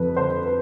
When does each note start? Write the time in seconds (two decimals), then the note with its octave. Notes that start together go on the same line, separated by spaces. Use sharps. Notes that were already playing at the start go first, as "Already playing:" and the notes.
Already playing: F2 F3 B4
0.17 D3 C5
0.46 B4